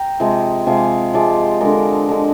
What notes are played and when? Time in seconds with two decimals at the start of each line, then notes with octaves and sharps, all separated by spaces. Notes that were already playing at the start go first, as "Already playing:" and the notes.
Already playing: G5 A#5
0.20 C3 F3 G#3
0.67 C3 F3 G#3 F5 G#5
1.13 C3 F3 G#3 D5 F5
1.61 D3 G#3 A#4 D5
2.09 D3 G#3